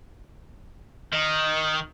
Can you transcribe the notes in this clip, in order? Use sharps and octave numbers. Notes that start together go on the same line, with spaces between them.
D#3